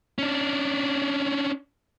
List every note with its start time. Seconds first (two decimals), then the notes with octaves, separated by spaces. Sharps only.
0.19 C#4 D4